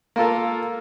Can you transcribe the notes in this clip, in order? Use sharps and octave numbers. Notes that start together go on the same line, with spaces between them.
A#3 F4 A4 A#4